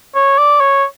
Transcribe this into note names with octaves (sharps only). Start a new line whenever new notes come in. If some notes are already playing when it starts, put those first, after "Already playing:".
C#5
D5
C#5